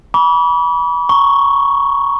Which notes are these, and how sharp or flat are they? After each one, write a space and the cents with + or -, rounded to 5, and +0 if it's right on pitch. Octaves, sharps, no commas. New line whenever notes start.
B5 -25 D6 -45
A#5 +0 C#6 +0